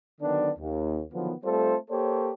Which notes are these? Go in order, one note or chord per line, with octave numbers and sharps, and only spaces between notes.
D3 D#3 F#3 B3 D4
D#2
D3 D#3 F3 F#3 B3
G3 A3 C4 F4 A4 C5
A#3 G4 A4 C5 C#5